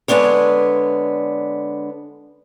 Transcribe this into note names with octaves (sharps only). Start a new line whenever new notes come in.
D3 G#3 B3 D4 C#5